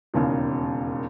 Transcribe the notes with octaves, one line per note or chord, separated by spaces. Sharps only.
E1 D#2 C#3